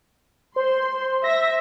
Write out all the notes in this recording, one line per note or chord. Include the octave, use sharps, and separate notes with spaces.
C5 C6
E5 A#6